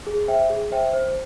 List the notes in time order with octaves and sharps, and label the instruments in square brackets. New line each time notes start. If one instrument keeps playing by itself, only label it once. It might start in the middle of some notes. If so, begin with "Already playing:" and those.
[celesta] G#4
C5 E5 G5
G#4
C5 E5 G5
C5